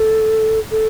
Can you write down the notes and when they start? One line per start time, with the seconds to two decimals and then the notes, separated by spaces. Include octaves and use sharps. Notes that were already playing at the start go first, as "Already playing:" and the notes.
Already playing: A4
0.71 A4